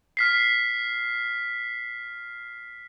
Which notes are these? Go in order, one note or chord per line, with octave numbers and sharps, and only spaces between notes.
F6 B6 C7